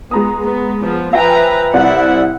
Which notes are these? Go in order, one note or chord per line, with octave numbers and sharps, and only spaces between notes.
G#3 B3 A#5 D#6
B3
F3 B3
F3 B4 E5 G5 G#5 A#5
C2 C4 E4 D5 F#5